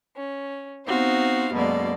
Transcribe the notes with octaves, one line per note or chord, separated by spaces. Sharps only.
C#4
B3 C4 D#4 F#4 C5 F5
F#2 B2 G#3 A#3 A4 D5